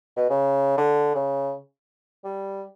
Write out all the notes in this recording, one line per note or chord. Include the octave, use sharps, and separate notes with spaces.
B2
C#3
D3
C#3
G3